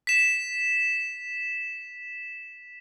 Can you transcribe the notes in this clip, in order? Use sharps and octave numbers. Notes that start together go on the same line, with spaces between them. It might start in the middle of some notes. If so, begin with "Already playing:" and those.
B6 E7